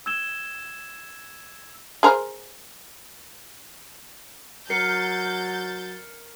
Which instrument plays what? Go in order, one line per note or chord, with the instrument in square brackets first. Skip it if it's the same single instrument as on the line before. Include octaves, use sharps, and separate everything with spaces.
[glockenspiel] E6 G#6 E7 G7
[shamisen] G#4 A#4 C5
[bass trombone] F#3 [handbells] A#4 [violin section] G6 A6 [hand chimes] C7 C#7